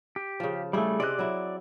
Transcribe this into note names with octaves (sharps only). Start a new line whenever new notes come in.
G4
C#3 F3
G3 A3 E4 G#4
C3 C4 D5 D#5 F#6
F#3 E4